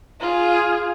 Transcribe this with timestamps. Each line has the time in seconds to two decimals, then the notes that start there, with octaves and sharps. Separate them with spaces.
0.21 F4 G#4